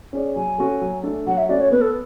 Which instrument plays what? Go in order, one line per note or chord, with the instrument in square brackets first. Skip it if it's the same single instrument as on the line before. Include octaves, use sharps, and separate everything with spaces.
[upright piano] C#4 G#4 D5
[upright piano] F#3 [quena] G#5
[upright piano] C#4 F#4 A4
F#3
A3 D4 A4
[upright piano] F#3 [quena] F#5
[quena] E5
[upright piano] A3 C#4 F#4 [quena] D5
[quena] C#5
[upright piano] B3 [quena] B4
[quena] A4